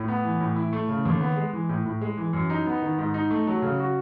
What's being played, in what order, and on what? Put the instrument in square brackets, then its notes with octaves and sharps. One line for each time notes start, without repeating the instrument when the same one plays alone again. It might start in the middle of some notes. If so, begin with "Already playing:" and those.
Already playing: [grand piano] A2
B3
E3
A2
E4
A3
C#3
D#2
B3
G#3
E3
A2
A2
G#3
E3
F#2
D#4
B3
D#3
G#2
D#4
A3
F#3
C#3
F#4